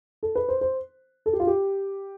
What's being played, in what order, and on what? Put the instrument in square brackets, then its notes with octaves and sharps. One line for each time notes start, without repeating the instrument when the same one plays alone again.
[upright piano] A4
B4
C5
C5
A4
G4
F4
G4